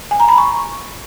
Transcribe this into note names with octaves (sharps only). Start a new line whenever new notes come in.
G#5
A#5
B5
C#6